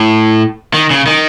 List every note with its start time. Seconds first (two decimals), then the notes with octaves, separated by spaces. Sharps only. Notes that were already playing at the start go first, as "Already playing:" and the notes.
Already playing: A2
0.74 D#3
0.90 C#3
1.06 D#3